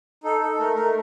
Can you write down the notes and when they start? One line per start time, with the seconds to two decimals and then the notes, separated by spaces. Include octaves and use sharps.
0.24 D#4 A4
0.42 A4
0.59 A3 A#4
0.76 A3 A#4